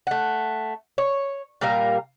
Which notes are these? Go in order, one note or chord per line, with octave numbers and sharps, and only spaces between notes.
A3 F#5
C#5
A#2 G3 A#4 F5